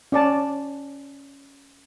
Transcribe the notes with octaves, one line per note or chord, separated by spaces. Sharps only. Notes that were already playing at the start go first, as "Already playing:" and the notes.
C#4 D5 A5